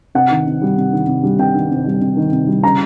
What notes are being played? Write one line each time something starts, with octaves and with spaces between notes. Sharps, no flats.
C3 F#5
D#3
C3
G3
C3
D#3
C3
G3
C3 G5
D#3
C3
G3
C3
D#3
C3
G3
C#3 A#5